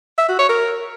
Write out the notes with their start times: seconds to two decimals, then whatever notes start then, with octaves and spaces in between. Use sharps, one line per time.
0.18 E5
0.28 F#4
0.39 C#5
0.49 A#4